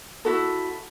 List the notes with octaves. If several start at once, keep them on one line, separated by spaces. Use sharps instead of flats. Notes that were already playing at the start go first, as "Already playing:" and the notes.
E4 F#4 A4